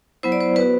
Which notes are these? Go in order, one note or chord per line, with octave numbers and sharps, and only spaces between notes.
F#3 B3 E4 C5
D5
C5
B3 F#4 B4